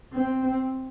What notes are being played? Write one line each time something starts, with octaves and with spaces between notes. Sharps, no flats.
C4